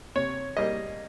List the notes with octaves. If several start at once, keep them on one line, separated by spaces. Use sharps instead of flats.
C3 C#5
G3 A#3 D#5